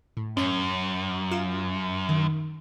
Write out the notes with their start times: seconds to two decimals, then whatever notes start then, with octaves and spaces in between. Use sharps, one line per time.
0.17 A2
0.37 F#2 C#4 C#5
1.31 F4 F5 E7
2.09 D#3